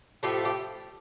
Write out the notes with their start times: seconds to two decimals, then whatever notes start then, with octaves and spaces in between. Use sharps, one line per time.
0.23 A2 F3 A3 G4
0.45 G4